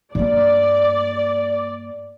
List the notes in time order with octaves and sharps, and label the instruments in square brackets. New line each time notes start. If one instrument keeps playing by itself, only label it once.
[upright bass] G2 A#3 [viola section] D5